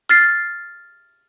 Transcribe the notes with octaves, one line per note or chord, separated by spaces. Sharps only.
F6 A6 C7